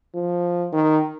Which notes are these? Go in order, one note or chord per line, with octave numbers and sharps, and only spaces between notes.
F3
D#3